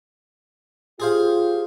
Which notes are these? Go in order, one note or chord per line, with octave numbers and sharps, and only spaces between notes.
F4 G4 G#4 C5 F5